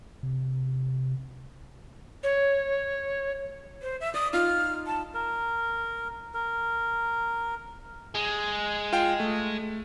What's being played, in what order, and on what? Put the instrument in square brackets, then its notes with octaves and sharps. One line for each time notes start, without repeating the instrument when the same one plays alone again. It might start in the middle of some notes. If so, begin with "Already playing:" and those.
[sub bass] C3
[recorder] C#5
[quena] C5
E5
[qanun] D5 [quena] D#6
[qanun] D#4 F4 [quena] F6
[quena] A5
[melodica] A#4
A#4
[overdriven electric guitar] G#3
[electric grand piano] F4 G5
A3